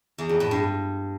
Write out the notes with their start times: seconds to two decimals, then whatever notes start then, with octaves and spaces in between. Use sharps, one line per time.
0.18 E2
0.29 F2
0.40 A2
0.51 G2